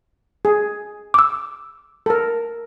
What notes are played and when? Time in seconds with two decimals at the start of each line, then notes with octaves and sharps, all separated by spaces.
0.45 G#4
1.14 D6 E6
2.06 A4 A#4